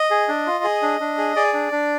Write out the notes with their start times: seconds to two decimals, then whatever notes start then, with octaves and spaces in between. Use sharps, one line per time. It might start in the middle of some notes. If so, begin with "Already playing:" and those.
Already playing: D#5
0.11 G#4
0.28 D4
0.47 F4
0.64 G#4
0.82 D4
1.00 D4
1.18 G#4
1.36 G#4 D5
1.54 D4
1.72 D4